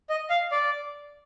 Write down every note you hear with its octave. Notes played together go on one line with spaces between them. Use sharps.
D#5
F5
D5